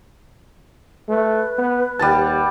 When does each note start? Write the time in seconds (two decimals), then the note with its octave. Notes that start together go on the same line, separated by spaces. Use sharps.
1.09 A3 B4
1.58 B3
1.99 D#2 G3 F#5 A5